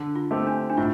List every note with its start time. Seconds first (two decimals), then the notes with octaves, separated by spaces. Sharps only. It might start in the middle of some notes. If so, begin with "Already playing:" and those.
Already playing: D3
0.15 F4
0.31 A3 C4 G4
0.47 D4
0.70 D4
0.77 A2 F4